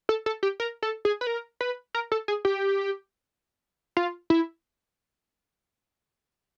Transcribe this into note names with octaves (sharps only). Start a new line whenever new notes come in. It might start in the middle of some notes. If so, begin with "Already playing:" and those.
A4
A4
G4
A#4
A4
G#4
B4
A#4
B4
A#4
A4
G#4
G4
F4
E4